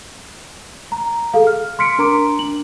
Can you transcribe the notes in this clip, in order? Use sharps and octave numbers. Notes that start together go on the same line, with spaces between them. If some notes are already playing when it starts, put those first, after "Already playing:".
A#5
G#4 A4 F5
F6
C6 F6 B6 C#7 D7
D4 A#4 A#5 C6 D6 D7
D4 F#7